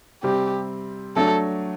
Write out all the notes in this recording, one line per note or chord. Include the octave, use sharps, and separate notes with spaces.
C3 G3 C4 G4
F#3 A3 D4 A4